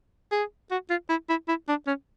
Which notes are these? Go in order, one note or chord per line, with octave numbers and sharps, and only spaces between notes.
G#4
F#4
F4
E4
E4
E4
D4
C#4